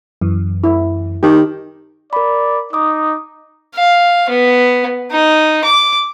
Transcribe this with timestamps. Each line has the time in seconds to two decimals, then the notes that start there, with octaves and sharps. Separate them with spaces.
0.21 F#2 E3
0.64 E4
1.23 D#3 G4
2.13 A#4 D5 B5
2.73 D#4 D6 D#6
3.75 F5
4.29 B3
5.11 D#4
5.64 D6